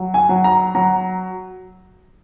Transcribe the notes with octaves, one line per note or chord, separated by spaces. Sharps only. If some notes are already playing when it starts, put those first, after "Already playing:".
Already playing: F#3
G#5
F#3
A#5
F#3 A#5